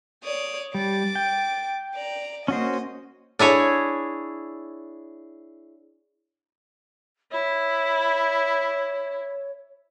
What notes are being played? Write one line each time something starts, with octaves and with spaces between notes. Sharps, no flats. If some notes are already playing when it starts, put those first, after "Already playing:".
C#5 D5 D#6
G3 D6 A6
G5
D5 A#5
A#3 C#4 F#4 C5 D#5
D4 E4 G#4 C#5
E4 C#5